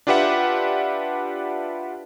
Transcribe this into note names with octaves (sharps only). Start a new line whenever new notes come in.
D4 F4 G4 B4 E5 F#5